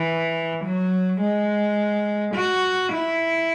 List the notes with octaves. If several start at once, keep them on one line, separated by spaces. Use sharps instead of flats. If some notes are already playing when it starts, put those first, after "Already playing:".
Already playing: E3
F#3
G#3
F#4
E4